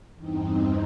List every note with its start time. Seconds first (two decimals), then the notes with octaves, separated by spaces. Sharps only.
0.16 E2 G2 C4 D#4